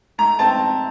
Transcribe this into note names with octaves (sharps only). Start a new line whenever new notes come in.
A3 A#5
C4 A5